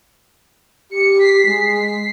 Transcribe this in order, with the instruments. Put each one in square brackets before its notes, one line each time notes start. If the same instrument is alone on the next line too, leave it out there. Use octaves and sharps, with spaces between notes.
[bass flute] G4 [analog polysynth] C#7
[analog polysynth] B6 C7
[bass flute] G#3